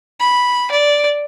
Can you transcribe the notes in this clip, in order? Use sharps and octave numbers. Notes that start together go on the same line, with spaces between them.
B5
D5